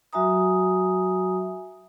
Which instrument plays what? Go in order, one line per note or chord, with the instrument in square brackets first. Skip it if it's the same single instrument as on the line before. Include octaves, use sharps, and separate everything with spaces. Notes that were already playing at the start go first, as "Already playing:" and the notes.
[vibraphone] F#3 F#4 E5 G#5 A#5 D#6